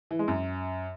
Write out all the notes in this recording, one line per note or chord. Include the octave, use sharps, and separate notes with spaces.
E3
G#3
F#2